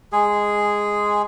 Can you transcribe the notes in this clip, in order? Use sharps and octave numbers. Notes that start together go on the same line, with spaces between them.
G#3 G#4